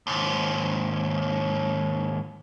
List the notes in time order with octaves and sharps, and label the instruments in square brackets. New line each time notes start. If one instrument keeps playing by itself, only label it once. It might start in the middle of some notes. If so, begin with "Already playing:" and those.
[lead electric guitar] D#2 G#2